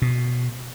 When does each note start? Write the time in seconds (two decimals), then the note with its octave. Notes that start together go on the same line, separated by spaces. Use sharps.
0.02 B2